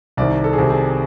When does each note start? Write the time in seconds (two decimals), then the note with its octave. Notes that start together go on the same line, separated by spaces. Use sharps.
0.17 C2 C3 D#3 D5
0.44 A4
0.53 G#4
0.58 C2 C3 D#3 G4
0.70 G#4